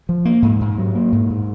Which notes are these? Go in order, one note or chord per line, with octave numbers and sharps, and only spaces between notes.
F3
A#3
G#2
G#2
F#3
A#3
G#2
G#2